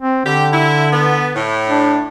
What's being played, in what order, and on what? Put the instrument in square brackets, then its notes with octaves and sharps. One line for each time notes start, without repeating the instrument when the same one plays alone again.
[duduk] C4
[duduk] D3 [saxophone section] G4
[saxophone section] E4
B3
A2
[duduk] D4